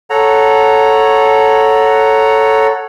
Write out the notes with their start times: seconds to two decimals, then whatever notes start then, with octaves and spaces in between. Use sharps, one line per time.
0.10 A4 C#5 F#5 A#5